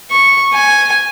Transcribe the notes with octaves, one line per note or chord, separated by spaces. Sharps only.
C#6
G#5